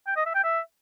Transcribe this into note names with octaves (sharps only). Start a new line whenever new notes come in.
G5
D#5
E5
G5
E5